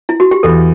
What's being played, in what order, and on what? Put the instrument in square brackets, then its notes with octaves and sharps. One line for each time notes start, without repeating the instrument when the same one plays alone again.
[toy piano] E4
F#4
G4
[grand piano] E2 [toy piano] A4